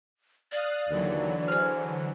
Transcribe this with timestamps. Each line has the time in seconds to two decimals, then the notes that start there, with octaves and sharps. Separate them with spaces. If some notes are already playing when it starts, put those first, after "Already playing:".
0.52 D5 F5 D#6 F#6
0.90 D#2 D3 E3 F#3
1.48 G#4 C5 F6